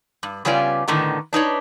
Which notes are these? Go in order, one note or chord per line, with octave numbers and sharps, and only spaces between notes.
G2
C#3 G3 B3 C#4 F4 D5
A2 D3 D#3 A3 B3 D#4
D4 D#4 B4 C#5